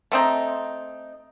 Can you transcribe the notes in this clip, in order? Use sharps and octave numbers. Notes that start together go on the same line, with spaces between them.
A3 C4 D#4